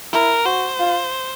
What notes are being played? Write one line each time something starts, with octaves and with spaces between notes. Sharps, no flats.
E4 A#4
F#4 C5
F4